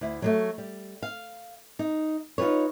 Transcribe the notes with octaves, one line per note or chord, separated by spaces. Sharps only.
D2 E4
F#3 G#3 A3
G3
F5
D#4
D#4 F4 G#4 B4 C#5